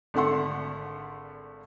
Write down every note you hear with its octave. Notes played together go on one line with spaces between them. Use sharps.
G#1 D3 A3 A4 F#5 C6